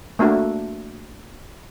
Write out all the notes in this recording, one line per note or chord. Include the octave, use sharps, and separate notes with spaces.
A3 A#3 D4 F#4 E5